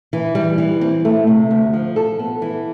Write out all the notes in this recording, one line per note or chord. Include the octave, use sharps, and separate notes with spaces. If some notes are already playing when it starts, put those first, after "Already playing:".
E3
G3
E3
C4
A3
C3
D2
F3
A4
B3
E3